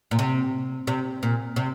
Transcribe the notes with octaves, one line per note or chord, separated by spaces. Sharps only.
A#2
C3
C3
A#2
C3